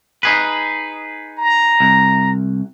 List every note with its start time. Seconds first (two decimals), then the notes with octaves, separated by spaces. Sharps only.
0.23 D#4 G#4 B4
1.38 A#5
1.80 C2